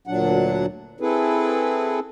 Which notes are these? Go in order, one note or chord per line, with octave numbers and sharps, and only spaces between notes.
D2 A#2 F#3 D4 F#5
C4 E4 G#4 A4 B4